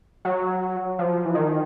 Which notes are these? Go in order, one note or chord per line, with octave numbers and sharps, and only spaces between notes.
F#3
F3
E3
D#3